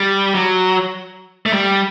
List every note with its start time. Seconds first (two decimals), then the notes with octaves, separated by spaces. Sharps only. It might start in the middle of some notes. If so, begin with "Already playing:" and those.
Already playing: G3
0.35 F#3
1.46 A3
1.53 G3